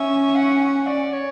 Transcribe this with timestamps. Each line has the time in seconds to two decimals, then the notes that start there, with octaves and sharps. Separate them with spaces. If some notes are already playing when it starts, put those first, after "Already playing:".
Already playing: C#4 E5
0.35 F#5
0.61 F#5
0.87 D5
1.13 C#5